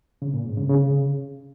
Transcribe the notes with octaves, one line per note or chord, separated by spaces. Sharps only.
C#3
A#2
G#2
C#3
C#3